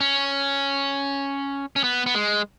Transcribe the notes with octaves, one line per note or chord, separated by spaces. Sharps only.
C#4
C#4
B3
B3
G#3